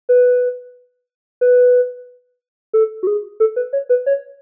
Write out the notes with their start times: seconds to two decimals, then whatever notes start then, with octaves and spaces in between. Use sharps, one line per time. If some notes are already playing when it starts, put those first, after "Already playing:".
0.09 B4
1.41 B4
2.73 A4
3.03 F#4
3.07 G#4
3.40 A4
3.56 B4
3.73 C#5
3.89 B4
4.06 C#5